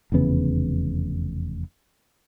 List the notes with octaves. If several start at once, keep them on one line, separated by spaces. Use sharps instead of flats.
F1 E2 C#3 B3